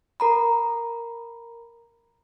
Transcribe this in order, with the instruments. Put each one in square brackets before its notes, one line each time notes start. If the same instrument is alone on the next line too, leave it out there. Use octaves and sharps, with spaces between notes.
[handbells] A#4 A#5 B5